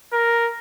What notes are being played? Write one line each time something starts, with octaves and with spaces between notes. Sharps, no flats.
A#4